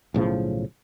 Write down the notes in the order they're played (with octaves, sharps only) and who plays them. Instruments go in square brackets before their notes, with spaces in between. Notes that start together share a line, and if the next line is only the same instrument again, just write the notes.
[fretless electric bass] B1 A2 C#3 F3